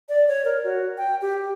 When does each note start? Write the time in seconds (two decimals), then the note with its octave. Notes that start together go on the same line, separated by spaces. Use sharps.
0.09 D5
0.28 C#5
0.45 A#4
0.64 F#4
0.97 G5
1.21 G4